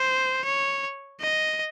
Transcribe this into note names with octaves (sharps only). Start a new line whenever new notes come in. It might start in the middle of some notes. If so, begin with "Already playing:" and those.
Already playing: C5
C#5
D#5